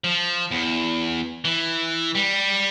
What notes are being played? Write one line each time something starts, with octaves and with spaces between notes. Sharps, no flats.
F3
E2
E3
G3